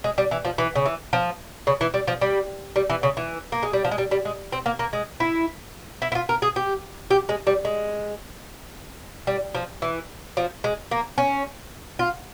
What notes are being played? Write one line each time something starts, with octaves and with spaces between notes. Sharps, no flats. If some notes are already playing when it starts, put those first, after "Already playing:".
G#3
G3
E3
F3
E3
C#3
E3
F3
C#3
E3
G3
F3
G3
G3
E3
C#3
E3
A#3
G#3
G3
F3
G#3
G3
G3
G#3
C4
A#3
A#3
G#3
E4
E4
E4
F4
A#4
G#4
G4
G4
G#3
G3
G#3
G3
F3
E3
F3
G#3
A#3
C#4
F4